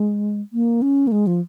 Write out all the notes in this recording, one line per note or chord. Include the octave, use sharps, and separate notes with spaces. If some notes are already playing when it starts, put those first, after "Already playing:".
Already playing: G#3
A#3
C#4
A#3
G#3
F3